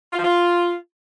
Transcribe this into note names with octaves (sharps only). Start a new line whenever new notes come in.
F4
F3
F4